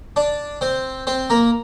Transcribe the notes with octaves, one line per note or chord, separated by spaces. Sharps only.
D4 D5
C4 C5
C4 C5
A#3 A#4